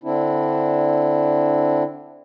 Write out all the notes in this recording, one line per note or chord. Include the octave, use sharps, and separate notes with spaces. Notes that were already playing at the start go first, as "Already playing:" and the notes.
D3 C4 D4 E4